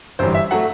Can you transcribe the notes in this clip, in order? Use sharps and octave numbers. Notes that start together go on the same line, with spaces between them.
G1 F#2 E3 G3 C5
E5
F#3 A3 F#5